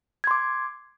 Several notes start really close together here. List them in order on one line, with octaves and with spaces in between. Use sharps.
G#6 C6 D6